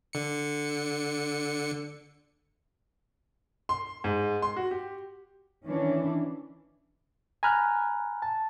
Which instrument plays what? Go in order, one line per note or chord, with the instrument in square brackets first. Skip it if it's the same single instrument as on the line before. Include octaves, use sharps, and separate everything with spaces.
[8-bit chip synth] D3 C#7
[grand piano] C6
G#2
C6
F#4
G4
[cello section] D#3 E3 C#4 D4 E4
[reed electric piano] G#5 A#5 B5 F6 F#6
A5